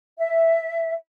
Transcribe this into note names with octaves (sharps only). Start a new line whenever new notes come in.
E5